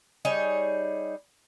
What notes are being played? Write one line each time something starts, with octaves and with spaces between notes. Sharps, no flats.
G3 D#4 G#4 C#5